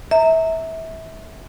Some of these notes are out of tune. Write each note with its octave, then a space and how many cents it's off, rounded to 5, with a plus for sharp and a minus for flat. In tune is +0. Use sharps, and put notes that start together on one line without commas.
E5 -25 A#5 -20